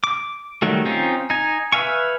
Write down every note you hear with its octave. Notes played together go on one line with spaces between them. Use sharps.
D6
D#3 F#3 G3 A3
C4 C#4 D#4 F4
D#4 G#5
B4 E5 F5 G#5 C#6